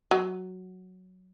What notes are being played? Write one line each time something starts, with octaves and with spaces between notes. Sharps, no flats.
F#3